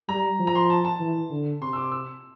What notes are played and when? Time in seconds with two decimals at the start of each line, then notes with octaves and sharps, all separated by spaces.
0.09 G3 A#5
0.39 F3
0.47 A#5
0.55 C6
0.70 A5
0.85 A5
1.00 E3
1.31 D3
1.61 C3 C6
1.73 E6
1.76 D6
1.92 E6